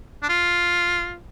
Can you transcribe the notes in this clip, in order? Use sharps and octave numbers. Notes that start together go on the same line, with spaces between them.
D4
F4